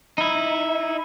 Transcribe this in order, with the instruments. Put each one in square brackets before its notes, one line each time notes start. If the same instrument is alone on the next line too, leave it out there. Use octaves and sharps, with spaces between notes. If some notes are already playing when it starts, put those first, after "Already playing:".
[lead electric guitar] D#4 E4